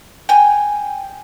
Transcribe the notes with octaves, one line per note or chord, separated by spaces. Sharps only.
G5 G#5